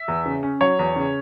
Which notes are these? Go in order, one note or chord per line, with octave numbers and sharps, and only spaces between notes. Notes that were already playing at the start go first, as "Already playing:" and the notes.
Already playing: E5
E2
C#3
C#4
F#3 C#5
E2
C#3